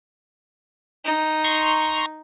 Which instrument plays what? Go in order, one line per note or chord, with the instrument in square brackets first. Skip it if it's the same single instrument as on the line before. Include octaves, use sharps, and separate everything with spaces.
[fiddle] D#4
[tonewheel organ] A#5 C6 C#6